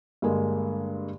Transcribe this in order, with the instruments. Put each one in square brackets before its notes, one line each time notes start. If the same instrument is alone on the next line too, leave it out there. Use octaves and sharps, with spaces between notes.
[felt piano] G2 D3 G#3 A#3